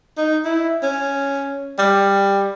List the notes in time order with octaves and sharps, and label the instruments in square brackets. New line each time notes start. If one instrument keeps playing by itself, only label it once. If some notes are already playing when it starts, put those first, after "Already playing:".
[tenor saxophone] D#4
E4
C#4
G3